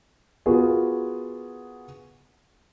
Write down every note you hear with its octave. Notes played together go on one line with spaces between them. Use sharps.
B3 F4 F#4 G#4 A#4